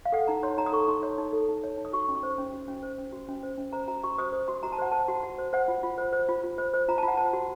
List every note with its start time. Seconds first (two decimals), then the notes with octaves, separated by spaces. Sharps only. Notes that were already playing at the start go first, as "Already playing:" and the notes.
0.05 F5
0.12 A4 F#5
0.28 D#4 A#5
0.43 C#5 C6
0.58 D#4 A#5
0.66 D#6
0.73 A4 C#6
0.88 D#4 C6
1.03 C#5
1.18 D#4
1.33 A4
1.49 D#4
1.64 C#5
1.78 D#4
1.85 D#6
1.93 F#4 C#6
2.08 C#4
2.15 C#6
2.23 C5
2.38 C#4
2.53 F#4
2.68 C#4
2.83 C5
2.98 C#4
3.12 F#4
3.29 C#4
3.43 C5
3.58 C#4
3.73 C5 A#5
3.88 F#4 A#5
4.03 F#4 C#6
4.18 C5 D#6
4.33 C5
4.48 F#4 C6
4.63 F#4 A#5
4.72 A5
4.78 C5 F#5
4.92 C5 A5
5.08 F#4
5.23 F#4
5.38 C5
5.53 C5 F#5
5.68 F4
5.83 F4
5.98 C5
6.13 C5
6.29 F4
6.44 F4
6.58 C5
6.74 C5
6.88 F4 A#5
6.98 A5
7.03 F4
7.08 F#5
7.17 C5 A5
7.33 F#4